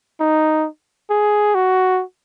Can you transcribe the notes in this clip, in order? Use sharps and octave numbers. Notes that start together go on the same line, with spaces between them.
D#4
G#4
F#4